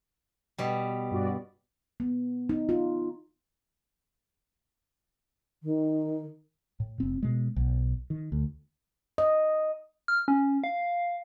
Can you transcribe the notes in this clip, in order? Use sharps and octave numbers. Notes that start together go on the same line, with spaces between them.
B2 G3
G2 F#4 D5
B3
D#4
F4
D#3
A2
F1 C4
B2 G#3
B1
D#3
D2
D#5
F6
C#4
F5